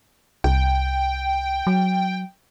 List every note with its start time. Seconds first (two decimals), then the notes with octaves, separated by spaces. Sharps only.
0.44 C2 G5
1.67 F#3